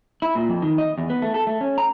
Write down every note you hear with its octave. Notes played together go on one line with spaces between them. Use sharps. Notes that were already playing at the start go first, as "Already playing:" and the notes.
E4
A#2
F2
D#3
D#5
E2
B3
A3
A4
A3
C#4
A#5